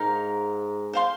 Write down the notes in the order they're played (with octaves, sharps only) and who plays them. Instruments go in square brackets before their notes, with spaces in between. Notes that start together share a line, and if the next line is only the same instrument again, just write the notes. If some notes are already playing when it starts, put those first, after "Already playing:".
Already playing: [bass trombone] G#2 [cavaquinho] D#4 A#4 F5
[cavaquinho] C5 F5 C6